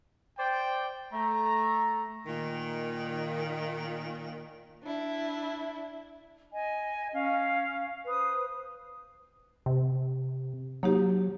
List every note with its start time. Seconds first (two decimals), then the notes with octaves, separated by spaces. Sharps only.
0.39 C5 D5 G5
1.13 A3 A#5
2.26 A#2 D#3
4.83 D4 E4
6.53 D#5 G#5
7.13 C#4 F5
8.06 B4 C5 D#6
9.66 C3
10.83 F#3 A#3 D#4 G4